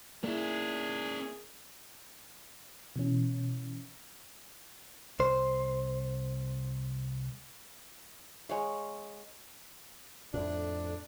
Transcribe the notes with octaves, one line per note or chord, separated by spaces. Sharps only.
A#3 C#4 E4 G#4 D5
B2 E3 C#4
C2 C5
G#3 C#5 F5
F2 A2 D4